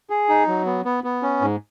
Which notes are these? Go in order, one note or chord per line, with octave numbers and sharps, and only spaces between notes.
G#4
D#4
F#3
B3
B3
B3
C#4
G#2